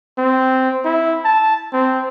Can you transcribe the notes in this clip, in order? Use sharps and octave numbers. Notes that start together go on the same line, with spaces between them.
C4
E4
A5
C4